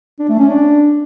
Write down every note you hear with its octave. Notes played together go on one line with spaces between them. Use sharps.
D4
A3
C#4
D4